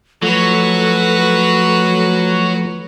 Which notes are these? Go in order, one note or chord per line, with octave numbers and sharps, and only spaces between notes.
F3 F#3 A3 F#4 A4 B4